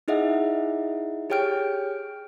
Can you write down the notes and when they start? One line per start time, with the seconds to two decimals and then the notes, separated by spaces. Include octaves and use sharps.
0.08 D#4 E4 G#4 D#5 E5 F#5
1.30 G4 G#4 C#5 G5 F6 D7